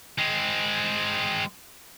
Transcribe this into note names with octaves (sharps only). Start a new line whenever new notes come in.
G#3 C4